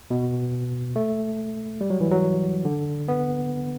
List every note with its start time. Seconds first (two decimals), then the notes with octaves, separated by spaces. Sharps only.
0.11 B2
0.96 A3
1.81 G3
1.90 F#3
2.01 E3
2.11 F#3
2.65 D3
3.08 B3